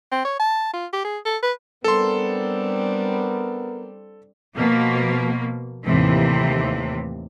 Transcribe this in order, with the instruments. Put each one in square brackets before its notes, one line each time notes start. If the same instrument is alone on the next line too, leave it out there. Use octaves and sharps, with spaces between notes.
[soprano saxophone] C4
C#5
A5
F4
G4
G#4
A4
B4
[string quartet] G3 C4 D4 [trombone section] B3 A#4 [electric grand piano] A4 C6
[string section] B2 F3 A#3
D#2 A2 C3 E3